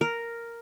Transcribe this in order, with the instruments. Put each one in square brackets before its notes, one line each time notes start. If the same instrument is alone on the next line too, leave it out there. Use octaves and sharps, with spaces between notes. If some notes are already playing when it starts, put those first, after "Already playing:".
[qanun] A#4